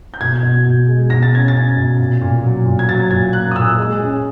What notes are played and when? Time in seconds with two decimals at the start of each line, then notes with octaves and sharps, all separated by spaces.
0.14 G6
0.21 B2 G#6
0.43 B2
0.65 B2
0.88 G#3
1.10 B2 A#6
1.23 A6
1.33 C#4 G#6
1.48 A6
1.55 C#4
1.77 B2
1.99 A#2
2.21 A#2
2.44 F#3
2.66 A#2
2.79 G#6
2.89 F#3 A6
3.11 A#2 G#6
3.33 A#3 F#6
3.51 D#6
3.56 A#2 E6
3.78 G#3
4.00 C#4